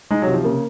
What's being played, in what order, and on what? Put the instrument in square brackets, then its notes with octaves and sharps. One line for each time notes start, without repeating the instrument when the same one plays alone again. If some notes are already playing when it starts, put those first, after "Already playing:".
[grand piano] G#3 [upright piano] D#4
[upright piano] C3 [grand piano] F#3
[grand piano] F3
[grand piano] C#3 [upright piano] A#3